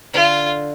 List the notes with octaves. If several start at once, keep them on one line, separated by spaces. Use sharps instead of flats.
D3 F4